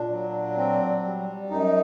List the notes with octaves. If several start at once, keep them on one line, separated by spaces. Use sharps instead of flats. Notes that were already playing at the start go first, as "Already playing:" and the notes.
Already playing: A#2 D4
F#3
C4
G3
F#2 D#4